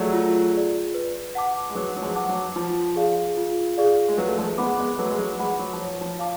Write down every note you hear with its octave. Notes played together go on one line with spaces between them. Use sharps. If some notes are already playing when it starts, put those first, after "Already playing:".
Already playing: F#3 A3 F4 G#4 D5
F4
G#4 D5
B4
F#5 A5 D6
G#3
F#3 B4
F#3
F3 G#3
F#5 A5 D6
F#3
F3 F4
G#4 D5 F5
F4
G#4 D5 F5
G#3
F#3 B4
A3
F3 G#3
G#3 B3 F#5 B5 D6
G#3 B3
F#3 A3 B4
G#3
F#3
F3 G#3 F#5 B5 D6
F#3
F3
C#5
F3
F5 A5 D6